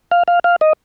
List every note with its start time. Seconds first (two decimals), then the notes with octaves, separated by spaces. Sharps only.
0.11 F5
0.28 F5
0.44 F5
0.61 D#5